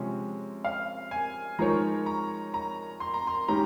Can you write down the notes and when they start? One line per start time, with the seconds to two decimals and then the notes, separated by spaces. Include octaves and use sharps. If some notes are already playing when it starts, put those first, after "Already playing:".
Already playing: C3 F3 G#3 C#4
0.64 F5
1.11 G#5
1.59 F3 G#3 D#4 A#4 C#5 A#5
2.06 A#5
2.54 A#5
3.00 C6
3.14 A#5
3.27 C6
3.48 D#3 G#3 C#4 G4 A#5